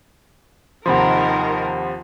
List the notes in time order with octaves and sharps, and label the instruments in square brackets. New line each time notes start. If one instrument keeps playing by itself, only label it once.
[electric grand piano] D#2 C3 F3 [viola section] D#3 A#4 [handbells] F#5 B5 C6